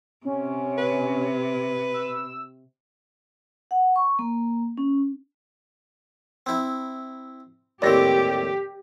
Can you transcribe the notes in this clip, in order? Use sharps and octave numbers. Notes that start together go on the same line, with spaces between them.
C3 C#4
B4
E6
F#5
C#6
A#3
C#4
C4 E4
D#2 A2 C4 G4 D5 A#6